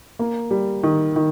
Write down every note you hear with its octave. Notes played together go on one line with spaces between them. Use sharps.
A#3
G3
D#3
D#3